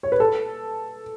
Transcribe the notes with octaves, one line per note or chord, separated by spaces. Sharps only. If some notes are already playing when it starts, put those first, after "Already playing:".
C#5
B4
A4